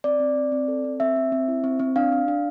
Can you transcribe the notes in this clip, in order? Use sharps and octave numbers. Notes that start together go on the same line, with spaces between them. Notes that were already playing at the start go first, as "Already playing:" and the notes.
C4 D5
C4
C4
C4
A4
C4
C4 E5
C4
C4
E4
C4
C4
D4 F5
D4
D4